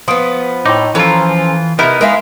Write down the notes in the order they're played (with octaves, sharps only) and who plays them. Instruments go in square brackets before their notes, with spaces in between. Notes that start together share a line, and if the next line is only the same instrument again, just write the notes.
[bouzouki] F3 B3 [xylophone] C6 D#6 D7
[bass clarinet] A2 [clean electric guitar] D#4 [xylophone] G5 C6 D6
[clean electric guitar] E3 F4 [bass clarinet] F3 [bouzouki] C#4 A4 A#5
[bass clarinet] C3 [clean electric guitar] B3 D#4 E4 [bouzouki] A#4 [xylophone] A#5 B5 F6
[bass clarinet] G#3 [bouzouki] A#4 E5 F5